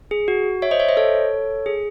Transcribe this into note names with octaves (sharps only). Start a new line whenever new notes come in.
G#4
F#4
C#5 E5
C5 D#5
C#5 E5
C5 D#5
A4 C#5
G#4